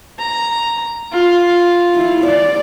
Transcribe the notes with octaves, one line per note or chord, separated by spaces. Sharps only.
A#5
F4
E4
D5